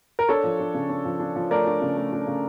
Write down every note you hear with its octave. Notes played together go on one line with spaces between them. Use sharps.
A#4
D4 A4 C#5
F3
D4
C#3
D4
F3
D4
F3
A3 A#4 D5
D4
C#3
A3
D4
C#3